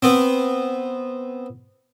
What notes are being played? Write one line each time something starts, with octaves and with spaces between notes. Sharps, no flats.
B3 C4